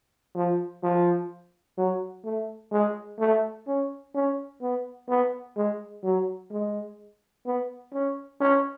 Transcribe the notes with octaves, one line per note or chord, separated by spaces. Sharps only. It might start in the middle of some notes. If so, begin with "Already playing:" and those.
F3
F3
F#3
A3
G#3
A3
C#4
C#4
B3
B3
G#3
F#3
G#3
B3
C#4
C#4